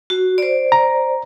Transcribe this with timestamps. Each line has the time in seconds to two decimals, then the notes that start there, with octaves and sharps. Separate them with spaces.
0.10 F#4
0.38 C5 D5
0.72 A#5